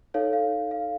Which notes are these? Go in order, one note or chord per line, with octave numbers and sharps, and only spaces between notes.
D#4 A4 C#5 F5
F5
F5